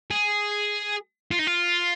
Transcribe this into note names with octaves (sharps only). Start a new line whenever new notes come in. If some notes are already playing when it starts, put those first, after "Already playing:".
G#4
F4
D#4
F4